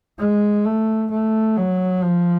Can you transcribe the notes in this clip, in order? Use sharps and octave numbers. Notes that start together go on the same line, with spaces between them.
G#3
A3
A3
F#3
F3